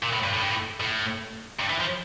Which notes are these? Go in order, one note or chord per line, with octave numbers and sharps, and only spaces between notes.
A#2
A2
G2
A2
G2
A2
A2
G2
E3
F3